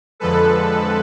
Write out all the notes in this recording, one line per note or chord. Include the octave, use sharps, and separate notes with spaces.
F2 D3 F3 G#3 A4 B4